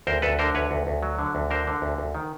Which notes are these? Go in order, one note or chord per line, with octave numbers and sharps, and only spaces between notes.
D2 A#4 C5
D2 A4 B4
D3 A#4 C5
D2 B4 C#5
D2
D2
F#3
D3
D2
D3 A#4 C5
D3
D2
D2
D#3